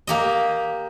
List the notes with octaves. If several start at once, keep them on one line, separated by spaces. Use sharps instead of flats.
A#3 G4 D#5